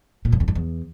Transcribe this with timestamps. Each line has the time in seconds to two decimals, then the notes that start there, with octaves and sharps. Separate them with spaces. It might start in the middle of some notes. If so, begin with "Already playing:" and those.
0.25 A#2
0.32 F#2
0.40 E2
0.48 F#2
0.55 E2